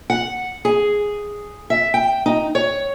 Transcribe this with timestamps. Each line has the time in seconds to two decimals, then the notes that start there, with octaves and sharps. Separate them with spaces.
0.10 F#5
0.65 G#4
1.70 E5
1.94 G5
2.26 D#4
2.55 C#5